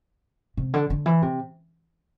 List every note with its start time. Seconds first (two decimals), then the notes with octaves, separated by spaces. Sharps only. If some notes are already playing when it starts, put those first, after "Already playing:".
0.57 C3
0.74 D3
0.90 D3
1.06 E3
1.22 C3